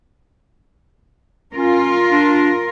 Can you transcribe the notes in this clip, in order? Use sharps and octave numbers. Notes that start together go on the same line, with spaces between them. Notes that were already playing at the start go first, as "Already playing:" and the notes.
C#4 F4 A#4
D4